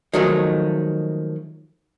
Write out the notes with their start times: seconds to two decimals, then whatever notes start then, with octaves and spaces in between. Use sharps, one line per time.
0.13 D#3 F3 F#3 G#3 A3 D#4